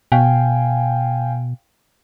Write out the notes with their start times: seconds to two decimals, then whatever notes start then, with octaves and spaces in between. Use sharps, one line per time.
0.12 B2 F5 G5 G#5